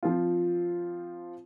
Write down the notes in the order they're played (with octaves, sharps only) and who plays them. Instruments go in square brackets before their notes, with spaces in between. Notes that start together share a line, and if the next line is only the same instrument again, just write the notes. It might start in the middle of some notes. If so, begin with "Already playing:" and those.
[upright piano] F3 C4 F4